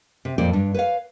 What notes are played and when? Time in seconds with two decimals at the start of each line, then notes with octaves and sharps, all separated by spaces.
0.25 C3
0.38 F2 A#2 C5 D5 G5
0.53 G2 D4
0.74 B4 C#5 F5